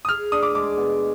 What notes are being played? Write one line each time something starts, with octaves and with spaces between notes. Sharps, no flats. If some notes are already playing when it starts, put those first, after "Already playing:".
D#6
G#4 F6
D4 D#6
D6
G#3 D6
B2